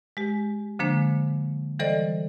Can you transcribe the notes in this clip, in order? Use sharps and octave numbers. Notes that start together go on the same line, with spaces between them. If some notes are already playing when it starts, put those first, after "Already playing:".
G#3 G4
D3 F3 G#3 A#3 D4 C5
E3 G3 A4 C5 D5 D#5